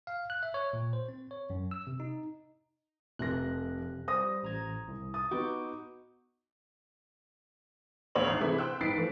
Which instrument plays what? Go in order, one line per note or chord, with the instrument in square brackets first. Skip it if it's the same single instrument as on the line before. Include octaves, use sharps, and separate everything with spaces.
[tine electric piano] F5
F#6
E5
C#5
A#2
C5
C4
C#5
F#2
E6
C3
D#4
[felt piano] F1 A#4 A#6 [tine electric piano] F2 C3 F#6
[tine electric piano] G3 [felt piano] C5 D#6 A#6
[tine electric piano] A1 A#5 G#6
C2
[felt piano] D#6 [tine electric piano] A6
[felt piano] B3 D#4 F#4 [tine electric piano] C#6 D6 G6
[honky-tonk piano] D2 C#5 F#7
G#1
C3 E3 A3 E4 G#4
C5 G5 E6 F#6
G2 D#4 A6 B6 C7 D7
E3 F3 A3